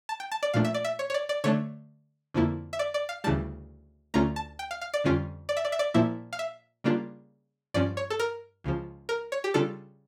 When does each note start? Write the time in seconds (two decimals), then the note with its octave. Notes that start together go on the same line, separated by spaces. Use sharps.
0.09 A5
0.20 G5
0.32 A5
0.43 D5
0.54 A#2 F3 A3 D4 F5
0.65 E5
0.74 D5
0.84 E5
0.99 C#5
1.10 C#5
1.14 D5
1.29 D5
1.44 D3 A3 D4 C#5
2.34 F2 D3 F3 A#3 E4
2.73 E5
2.79 D5
2.94 D5
3.09 F5
3.24 D2 C#3 E3 G3 A5
4.14 D2 D3 A3 C#4 F4 A#5
4.36 A5
4.59 G5
4.71 F5
4.81 F5
4.94 D5
5.04 F2 D3 G3 C#4 F4
5.49 D5
5.57 E5
5.65 D5
5.72 E5
5.79 D5
5.94 A#2 F3 A#3 E4 E5
6.33 F5
6.39 E5
6.84 C#3 G3 A#3 D4 F4
7.74 G2 F3 C#4 D5
7.97 C#5
8.10 A4
8.19 A#4
8.64 C#2 C#3 F3
9.09 A#4
9.32 C#5
9.44 G4
9.54 C#3 G3 D4 F4 A4